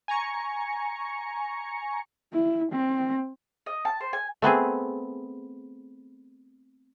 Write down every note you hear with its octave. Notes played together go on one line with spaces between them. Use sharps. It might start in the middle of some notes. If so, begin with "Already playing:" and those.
G#5 A#5 C#6 C#7
E4
C4
D#5
A5
C5
G#5
A3 B3 C4 G#4